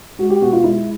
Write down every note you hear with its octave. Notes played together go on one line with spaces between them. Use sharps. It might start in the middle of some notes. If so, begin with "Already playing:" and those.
G#3 F#4
G4
B2 F#4
F4
G#3 E4